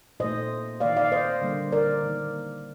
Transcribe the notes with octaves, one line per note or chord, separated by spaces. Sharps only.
A#2 A3 C5 D#5
D#3 A#3 D5 F5
D5 F5
C5 D#5
D3 G3 A#3
A#4 D5
D#3 A#3